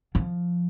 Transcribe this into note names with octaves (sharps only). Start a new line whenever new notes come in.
F3